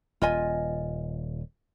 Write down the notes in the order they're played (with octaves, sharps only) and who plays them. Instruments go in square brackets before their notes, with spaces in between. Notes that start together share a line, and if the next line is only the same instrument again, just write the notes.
[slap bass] D#1 [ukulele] F4 D#5 G#5